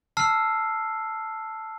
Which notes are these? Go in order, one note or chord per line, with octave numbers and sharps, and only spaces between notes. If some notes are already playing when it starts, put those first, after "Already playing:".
A5 E6 F6 C7